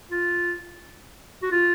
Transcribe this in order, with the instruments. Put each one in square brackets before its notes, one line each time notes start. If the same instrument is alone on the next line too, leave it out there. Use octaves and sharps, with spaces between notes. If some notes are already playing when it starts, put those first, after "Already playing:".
[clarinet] F4
F#4
F4